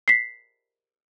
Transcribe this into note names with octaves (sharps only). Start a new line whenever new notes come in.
B6 C7